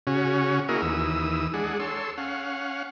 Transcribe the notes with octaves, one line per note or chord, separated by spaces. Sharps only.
C#3 C#4 F#4
A#3 E4 F#4 G#4 A#4 D#5
D#2 E3 D#6 E6
G#3 D4 G#4 F#5
A4 C#5 C6 E6
C#4 F5 F#5